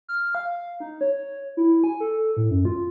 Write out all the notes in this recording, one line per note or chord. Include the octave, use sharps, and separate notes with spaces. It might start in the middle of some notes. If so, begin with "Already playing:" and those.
F6
F5
D#4
C#5
E4
G#5
A4
A2
F#2
F4